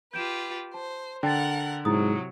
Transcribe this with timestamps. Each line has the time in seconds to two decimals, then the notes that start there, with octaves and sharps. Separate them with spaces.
0.14 F4 G4 B4 G6 D7 E7
0.74 C5 A5
1.23 D3 A#4 F#5 G5 A5 A6
1.85 G#2 C3 F#3 E4 A#5 D#6